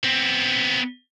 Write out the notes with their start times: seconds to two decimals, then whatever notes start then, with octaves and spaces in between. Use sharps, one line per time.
0.04 B3 C4